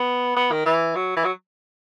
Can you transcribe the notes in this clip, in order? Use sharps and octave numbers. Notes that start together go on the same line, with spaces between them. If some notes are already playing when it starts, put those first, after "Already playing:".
Already playing: B3
B3
D#3
E3
F#3
E3
F#3